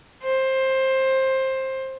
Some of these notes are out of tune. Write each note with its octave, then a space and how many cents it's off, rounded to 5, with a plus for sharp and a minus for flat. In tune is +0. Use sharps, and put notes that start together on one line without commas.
C5 +15